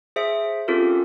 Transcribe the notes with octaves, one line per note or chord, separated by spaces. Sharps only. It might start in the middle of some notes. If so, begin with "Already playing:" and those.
G#4 C5 E5 D7
C4 C#4 F4 G4 A4 A#4